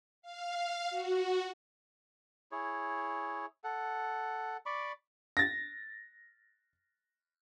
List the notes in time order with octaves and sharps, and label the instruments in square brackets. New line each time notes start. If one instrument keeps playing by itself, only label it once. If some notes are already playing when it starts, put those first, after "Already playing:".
[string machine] F5
F#4
[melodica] E4 G#4 C#5
A4 F#5
D5 B5 C#6 D6
[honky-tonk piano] A6 A#6